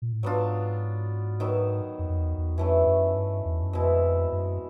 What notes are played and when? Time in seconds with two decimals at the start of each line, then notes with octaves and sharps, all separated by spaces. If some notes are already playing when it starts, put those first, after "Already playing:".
0.02 A#2
0.13 A2
0.23 G#2 F#3 B3 D4 F4
1.40 D#3 F#3 B3
1.99 F2
2.10 F2
2.18 E2
2.38 E2
2.57 F2 E3 A3 C#4
2.86 F#2
3.15 G2
3.45 E2
3.62 F#2
3.73 F2 B2 G#3 C4 E4
4.32 F#2